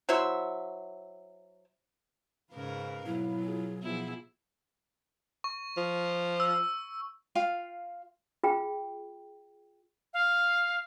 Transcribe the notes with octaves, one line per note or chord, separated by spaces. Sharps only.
F#3 E4 C5 E5
G#2 C#3 A#4 B4 F5
B2 F#3 E4
F4 G#4
B2 F3 B3 E4 F4 G#4
C#6
F3
E6
F4 F5 G5
F4 G#4 G5
F5